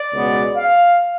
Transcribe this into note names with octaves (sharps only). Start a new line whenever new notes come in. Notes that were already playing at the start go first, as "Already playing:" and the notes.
Already playing: D5
C#2 B2 G#3 B3
F5